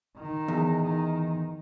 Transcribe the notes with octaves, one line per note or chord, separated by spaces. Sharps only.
D#3
E2
D#3